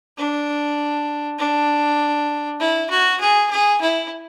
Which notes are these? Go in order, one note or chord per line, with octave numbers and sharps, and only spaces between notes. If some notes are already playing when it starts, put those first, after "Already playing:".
D4
D4
E4
F#4
G#4
G#4
E4